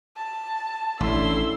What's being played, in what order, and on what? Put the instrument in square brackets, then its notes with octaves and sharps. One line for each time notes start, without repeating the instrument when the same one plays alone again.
[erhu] A5
[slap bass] A1 [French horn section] C#4 D4 A4 [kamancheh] E4 C6 [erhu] E6